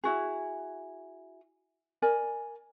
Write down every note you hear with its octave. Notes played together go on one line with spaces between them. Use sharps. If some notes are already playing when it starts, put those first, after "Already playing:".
E4 F#4 G#4
A#4 D5 G#5